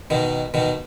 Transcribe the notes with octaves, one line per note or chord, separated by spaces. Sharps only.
B2 D#3
B2 D#3